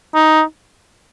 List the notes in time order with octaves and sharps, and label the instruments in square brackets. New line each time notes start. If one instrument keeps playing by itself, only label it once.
[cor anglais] D#4